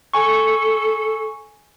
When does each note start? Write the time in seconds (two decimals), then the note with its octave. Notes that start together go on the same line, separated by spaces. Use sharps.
0.14 A4 G#5 C#6